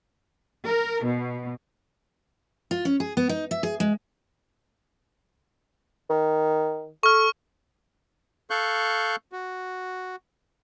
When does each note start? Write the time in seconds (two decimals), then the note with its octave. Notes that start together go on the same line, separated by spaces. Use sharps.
0.66 A#4
1.05 B2
2.71 F4
2.85 C#4
3.00 G#4
3.17 B3
3.29 D#4
3.51 E5
3.63 G#4
3.80 G#3
6.10 D#3
7.03 A4 C#6 F6
8.50 A4 F5 C#6 F#6 G6
9.32 F#4